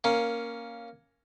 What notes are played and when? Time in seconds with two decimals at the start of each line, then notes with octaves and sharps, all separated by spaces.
0.04 A#3 C#4